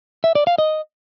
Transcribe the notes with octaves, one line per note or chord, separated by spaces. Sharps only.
E5
D5
F5
D#5